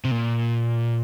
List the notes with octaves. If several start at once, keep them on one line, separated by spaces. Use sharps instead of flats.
C3
A#2